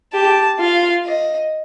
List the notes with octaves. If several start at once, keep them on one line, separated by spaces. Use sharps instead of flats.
G4 A5
F4 F5
D#5